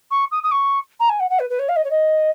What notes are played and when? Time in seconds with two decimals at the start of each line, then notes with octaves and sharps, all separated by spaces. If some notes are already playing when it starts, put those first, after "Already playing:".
0.11 C#6
0.31 D#6
0.43 D#6
0.51 C#6
1.00 A#5
1.09 G#5
1.20 F#5
1.30 F#5
1.39 B4
1.50 B4
1.59 C#5
1.69 F5
1.76 D#5
1.84 C#5
1.90 D#5